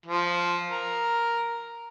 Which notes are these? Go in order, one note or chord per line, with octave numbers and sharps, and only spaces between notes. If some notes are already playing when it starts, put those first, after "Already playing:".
F3
A#4